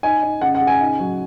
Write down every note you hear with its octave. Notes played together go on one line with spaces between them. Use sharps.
D#4 G#5
D#4
C#3 F#5
F#5
C#3
G#5
D#4
F#3